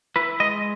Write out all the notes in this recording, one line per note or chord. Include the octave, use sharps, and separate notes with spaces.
E4 B4
G#3 D#5